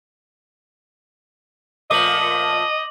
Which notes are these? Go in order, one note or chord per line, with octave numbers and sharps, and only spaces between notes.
A#2 F3 A3 D#5 D6 F#7